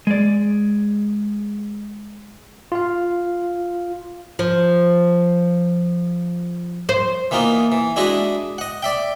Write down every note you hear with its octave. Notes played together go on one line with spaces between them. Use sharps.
G#3 D5
F4 F5
F3
C5
E3 A#3 B3 D#4 F4
E3
G#3 D4 E4 F#4 B4 D#5
D#5 F#5
D5 E5 G5